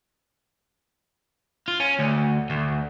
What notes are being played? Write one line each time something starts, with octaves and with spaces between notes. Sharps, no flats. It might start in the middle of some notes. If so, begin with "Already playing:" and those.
F4
C#4
D2
D2